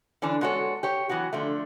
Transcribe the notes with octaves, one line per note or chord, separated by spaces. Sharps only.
D3 E3 C#4 D4
G#3 B3 F#4 A4 C#5
G4 C#5
E3 F#3 B3 F#4
D3 F3 A3